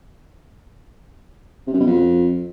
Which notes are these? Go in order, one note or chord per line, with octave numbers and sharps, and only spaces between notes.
C3
F#2
B2
F2